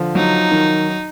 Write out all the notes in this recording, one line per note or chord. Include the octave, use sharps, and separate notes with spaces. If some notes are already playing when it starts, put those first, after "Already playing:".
Already playing: D3 F3
F#3 D#4
D#3